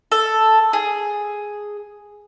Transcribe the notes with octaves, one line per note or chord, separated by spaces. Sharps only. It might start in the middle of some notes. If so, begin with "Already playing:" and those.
A4
G#4